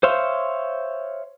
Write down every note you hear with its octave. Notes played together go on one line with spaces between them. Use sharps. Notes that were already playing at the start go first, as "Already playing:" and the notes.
C5 C#5 E5 F5 C6